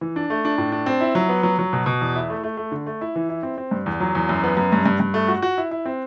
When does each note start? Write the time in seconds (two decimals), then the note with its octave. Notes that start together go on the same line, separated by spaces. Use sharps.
0.01 E3
0.16 D4
0.30 A3
0.45 D4
0.58 A2
0.72 D4
0.86 C4
1.01 E4
1.15 F#3
1.29 B3
1.43 F#3
1.59 F#3
1.73 B2
1.86 B2
2.01 E2
2.16 E4
2.30 A3
2.44 A3
2.57 A3
2.72 D3
2.86 A3
3.01 E4
3.16 E3
3.29 E4
3.43 C4
3.58 C4
3.71 G2
3.86 E2
4.00 F#3
4.15 E2
4.29 F#2
4.44 B3
4.57 F#2
4.72 G2
4.86 G2
5.00 G2
5.14 A3
5.28 F#4
5.42 F#4
5.58 E4
5.71 E4
5.86 C4